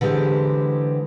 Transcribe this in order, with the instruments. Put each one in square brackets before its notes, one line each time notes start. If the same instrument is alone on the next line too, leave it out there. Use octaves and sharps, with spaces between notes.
[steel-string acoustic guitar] D3 E3 G#3 C4 G4 C5